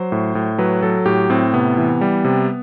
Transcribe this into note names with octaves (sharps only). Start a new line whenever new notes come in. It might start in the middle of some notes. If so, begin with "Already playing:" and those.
Already playing: F#3 C5
A2
A2
F#3 B4
F#3 A4
A2 G4
A2 C4
C3 B3
E3
G3
C3